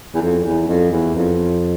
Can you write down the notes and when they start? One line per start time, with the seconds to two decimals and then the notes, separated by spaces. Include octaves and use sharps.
0.14 E2
0.22 F2
0.44 E2
0.68 F2
0.91 E2
1.15 F2